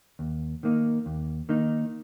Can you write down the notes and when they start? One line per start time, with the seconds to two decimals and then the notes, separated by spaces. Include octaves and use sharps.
0.19 D#2
0.63 D#3 A#3 D#4
1.06 D#2
1.49 D#3 A#3 D#4